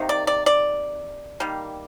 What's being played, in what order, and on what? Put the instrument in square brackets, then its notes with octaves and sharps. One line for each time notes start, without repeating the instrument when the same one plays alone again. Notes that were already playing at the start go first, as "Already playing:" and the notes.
Already playing: [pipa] C3 D#3 A#3
D5
D5
D5
D#3 G3 A#3